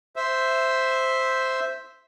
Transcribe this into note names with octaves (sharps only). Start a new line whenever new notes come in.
C5 E5